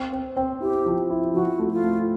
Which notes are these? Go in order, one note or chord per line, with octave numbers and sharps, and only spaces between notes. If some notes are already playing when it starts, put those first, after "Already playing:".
Already playing: C4
C4
C4
E4 G4
F3
E4
F3 F#4
A3
F4
A3